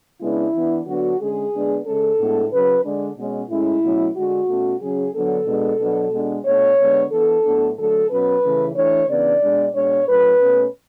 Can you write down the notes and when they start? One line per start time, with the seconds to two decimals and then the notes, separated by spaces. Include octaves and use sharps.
0.21 C#3 G#3 B3 D4 E4
0.54 E3 B3 D4
0.86 D3 F#3 B3 D4 F#4
1.19 D3 G#3 C#4 G#4
1.52 D3 G#3 B3 D4
1.85 C#3 G#3 C#4 A4
2.18 A2 G#3 B3 D4
2.51 C#3 F#3 C#4 B4
2.84 D3 G#3 D4
3.17 B2 G#3 C#4
3.49 A2 G#3 C#4 E4
3.82 B2 F#3 A3 C#4
4.16 D3 G#3 D4 F#4
4.48 B2 A3 C#4
4.81 C#3 F#3 C#4 G#4
5.14 D3 F#3 B3 D4 A4
5.47 B2 G#3 B3 D4
5.80 B2 F#3 B3 D4
6.12 B2 G#3 D4
6.45 B2 A3 D4 C#5
6.79 D3 G#3 B3 D4
7.11 E3 B3 D4 A4
7.44 A2 F#3 B3 D4
7.77 D3 F#3 A3 A4
8.09 B2 F#3 C#4 B4
8.43 C#3 E3 A3 C#4
8.75 E3 A3 D4 C#5
9.08 C#3 E3 B3 D4 D5
9.41 B2 G#3 D4
9.74 B2 G#3 D4 C#5
10.06 A2 F#3 C#4 B4
10.40 B2 A3 C#4